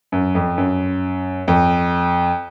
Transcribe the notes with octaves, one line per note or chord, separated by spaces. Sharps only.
F#2
F2
F#2
F2